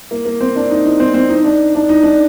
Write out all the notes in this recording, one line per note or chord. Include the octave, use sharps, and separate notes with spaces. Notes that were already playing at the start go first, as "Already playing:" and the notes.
A#3
A#3
C4
D4
D#4
D#4
C4
C4
D#4
D4
D4
D#4
D4